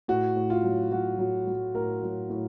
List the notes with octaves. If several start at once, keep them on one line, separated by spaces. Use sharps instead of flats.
A2 F#4
A2
F4
F#3
F#3 F#4
F#3
F#3
A2 A#4
F#3
A2